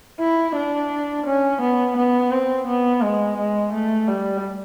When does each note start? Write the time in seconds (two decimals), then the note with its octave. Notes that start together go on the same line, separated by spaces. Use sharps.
0.20 E4
0.56 D4
1.26 C#4
1.61 B3
1.97 B3
2.31 C4
2.67 B3
3.02 G#3
3.37 G#3
3.73 A3
4.08 G3